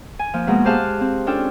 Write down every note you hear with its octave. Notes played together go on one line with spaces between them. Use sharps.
G#5
F3 A#3
B2 G#3 A#3 F#4
G4 G#4 C5 F5 A5 F#6
C4
C#4 D4 F4 A4 G5